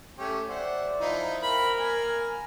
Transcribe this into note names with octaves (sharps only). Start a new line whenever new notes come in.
A3 C#4 G4
C5 D5 E5 F#5
F3 D#4 E4
C4 A#4 B5
A#3 G#5